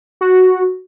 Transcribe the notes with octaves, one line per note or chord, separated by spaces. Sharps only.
F#4